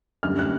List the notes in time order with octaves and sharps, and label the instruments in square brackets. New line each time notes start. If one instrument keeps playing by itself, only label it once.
[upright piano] F#2 D3 G3 F6
F#6